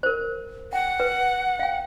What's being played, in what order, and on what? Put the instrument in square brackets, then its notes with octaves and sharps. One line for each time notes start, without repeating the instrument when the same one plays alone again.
[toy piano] A#4 C5
[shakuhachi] F#5 [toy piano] G5
[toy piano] B4
F5 G5